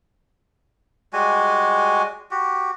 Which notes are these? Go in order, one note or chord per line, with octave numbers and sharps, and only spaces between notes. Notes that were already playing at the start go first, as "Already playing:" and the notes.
G3 G#3 F#4 G#5
F#4 G4